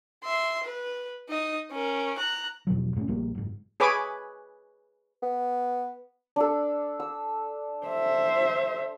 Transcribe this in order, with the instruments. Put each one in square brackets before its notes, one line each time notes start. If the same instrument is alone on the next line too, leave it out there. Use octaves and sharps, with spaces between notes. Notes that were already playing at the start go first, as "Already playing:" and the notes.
[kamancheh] E5 C6
B4
D#4 D#5
C#4 A#4
A#5 F#6
[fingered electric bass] E2 B2 F3 F#3
G#2 A3 C4 C#4
A#1 F3 G3 A#3
F#1 G#2
[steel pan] G#4 B4 C#5 G#5 B5 D6
[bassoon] B3
[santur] D4 A4
E6
[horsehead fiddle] C5 E5